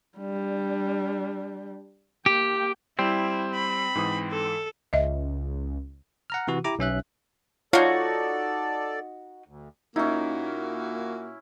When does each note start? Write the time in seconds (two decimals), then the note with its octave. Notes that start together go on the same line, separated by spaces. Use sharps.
0.18 G3 D4
2.26 A#3 G4 G5
2.99 G3 C4 E4
3.54 B5
3.95 G#2 E3 D#6
4.31 A4
4.93 C#2 D#5 E5
6.30 F#5 A#5 F6
6.48 C3 E3 F#4
6.64 E4 G4 A#5 D6
6.79 B1 C#4 E5 F#6
7.73 D#4 F4 F#4 A4 C#5 D5 F5
9.48 D2
9.96 A#2 A#3 C#4 D#4 E4 F#4